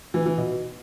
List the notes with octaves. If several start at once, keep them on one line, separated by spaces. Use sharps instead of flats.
E3
E3
B2